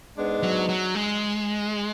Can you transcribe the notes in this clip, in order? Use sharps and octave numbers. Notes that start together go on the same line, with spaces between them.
G#2 G#3 B3 D4
F#3
F#3
G#3